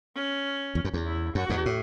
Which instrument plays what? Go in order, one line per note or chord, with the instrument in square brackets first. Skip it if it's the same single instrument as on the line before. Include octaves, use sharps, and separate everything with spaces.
[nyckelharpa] C#4
[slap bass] E2
F#2
E2
[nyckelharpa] E4
[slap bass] F#2 [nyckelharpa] F#4
[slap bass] E2 G#2
A2